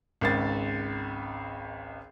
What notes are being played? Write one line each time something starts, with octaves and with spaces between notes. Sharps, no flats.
G#1 C#2 A6